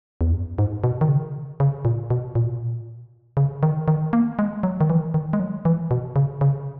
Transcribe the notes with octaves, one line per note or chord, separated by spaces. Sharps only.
E2
F#2
G#2
B2
D#3
C#3
C#3
A#2
B2
A#2
B2
A#2
C#3
D#3
D#3
A#3
G#3
F#3
D#3
E3
D#3
G#3
F#3
E3
B2
C#3
C#3